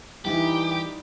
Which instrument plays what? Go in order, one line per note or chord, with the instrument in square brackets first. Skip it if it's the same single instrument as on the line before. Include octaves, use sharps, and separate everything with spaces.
[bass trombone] E3 [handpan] G3 D#4 E4 [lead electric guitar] G4